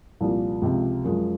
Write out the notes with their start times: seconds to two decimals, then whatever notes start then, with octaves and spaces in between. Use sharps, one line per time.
0.21 C2 A#2 F3
0.62 C#2 C3 F3
1.04 F#2 F3 G#3